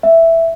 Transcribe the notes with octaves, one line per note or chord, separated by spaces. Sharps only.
E5